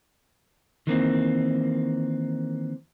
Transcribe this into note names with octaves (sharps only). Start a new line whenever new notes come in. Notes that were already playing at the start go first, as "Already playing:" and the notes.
D#3 E3 A#3 C4